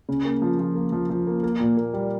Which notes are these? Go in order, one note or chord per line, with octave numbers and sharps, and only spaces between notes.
C#3
A#3
F3
F3
A#3
F3
F3
A#3
A#3
A#2
A#3
G3